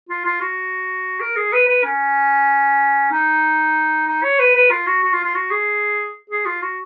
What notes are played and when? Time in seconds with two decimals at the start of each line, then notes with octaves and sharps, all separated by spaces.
0.09 F4
0.25 F4
0.41 F#4
1.20 A#4
1.36 G#4
1.52 B4
1.68 B4
1.84 C#4
3.11 D#4
4.07 D#4
4.23 C#5
4.39 B4
4.55 B4
4.70 F4
4.87 F#4
5.03 F#4
5.13 F4
5.24 F4
5.35 F#4
5.51 G#4
6.30 G#4
6.46 F4
6.62 F#4